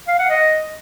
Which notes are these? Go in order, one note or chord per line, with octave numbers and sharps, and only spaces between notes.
F5
F#5
D#5